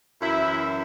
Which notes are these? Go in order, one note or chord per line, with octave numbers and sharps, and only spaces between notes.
F#2 E3 E4